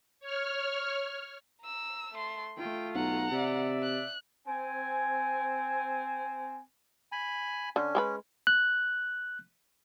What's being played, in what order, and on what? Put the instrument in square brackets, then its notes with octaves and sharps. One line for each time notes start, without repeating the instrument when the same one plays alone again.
[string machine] C#5 F6
[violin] A#5 E6
A3 C6
[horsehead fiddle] A3 F4 [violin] G5
[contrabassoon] B1 [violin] F#5 A#5
[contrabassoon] C3 [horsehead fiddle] D5 E5
[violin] F#6
[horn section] C4 G#5
[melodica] G#5 B5
[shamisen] D3 [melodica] C#4
[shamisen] G#3 G4 B4
[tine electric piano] F#6